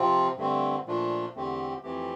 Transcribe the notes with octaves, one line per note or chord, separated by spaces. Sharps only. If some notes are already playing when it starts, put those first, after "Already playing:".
Already playing: C3 F3 C4 F4
G2 D3 A3 C4
A#2 F3 A3 D4 F4
E2 D3 A3 C4 G4
F2 E3 A3 C4 G4